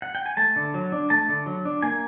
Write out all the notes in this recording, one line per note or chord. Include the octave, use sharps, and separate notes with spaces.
F#5
G5
G#5
A3 A5
D3
F#3
D4
A3 A5
D3
F#3
D4
A#3 G#5